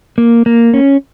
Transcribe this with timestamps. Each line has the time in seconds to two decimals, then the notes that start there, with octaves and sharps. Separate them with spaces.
0.18 A#3
0.46 A#3
0.74 C#4